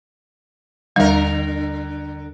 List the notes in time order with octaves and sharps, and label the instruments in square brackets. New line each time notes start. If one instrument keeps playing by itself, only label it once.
[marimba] D#2 G3 [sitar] D3 A#4